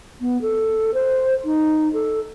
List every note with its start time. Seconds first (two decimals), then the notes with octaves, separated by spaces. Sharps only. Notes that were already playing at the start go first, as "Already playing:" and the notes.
0.21 B3
0.42 A4
0.94 C5
1.45 D#4
1.93 A4